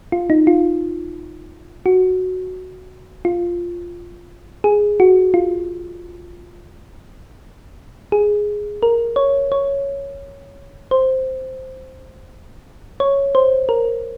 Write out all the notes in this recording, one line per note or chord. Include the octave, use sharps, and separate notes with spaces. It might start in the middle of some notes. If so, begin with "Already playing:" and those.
F4
D#4
F4
F#4
F4
G#4
F#4
F4
G#4
A#4
C#5
C#5
C5
C#5
C5
A#4